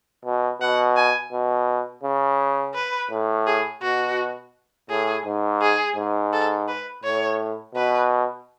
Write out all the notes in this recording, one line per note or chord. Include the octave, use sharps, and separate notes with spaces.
B2
B2 F#5
G#5
B2
C#3
B4
A2
G#4
B2 F#4
A2 G#4
G#2
G#4
G#2
A4
B4
A2 C#5
B2 B4